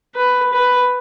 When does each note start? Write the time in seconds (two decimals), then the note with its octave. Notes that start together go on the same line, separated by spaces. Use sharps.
0.15 B4
0.53 B4